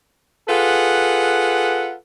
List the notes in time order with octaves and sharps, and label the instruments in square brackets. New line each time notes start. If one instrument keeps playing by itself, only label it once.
[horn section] F4 G#4 A4 B4 F#5